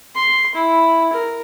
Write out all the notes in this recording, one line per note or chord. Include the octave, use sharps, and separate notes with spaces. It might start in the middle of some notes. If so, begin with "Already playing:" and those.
C6
E4
A#4